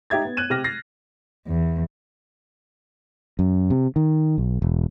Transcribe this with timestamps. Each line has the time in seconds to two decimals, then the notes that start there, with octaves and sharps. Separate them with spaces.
0.10 D#4 G4 E5 G#6 A6
0.25 B3
0.37 F#6 G#6 D#7 E7
0.50 C3 G4 F6 A#6
0.64 A6 A#6 C7
1.47 E2
3.39 F#2
3.70 C3
3.96 D#3
4.38 B1
4.62 E1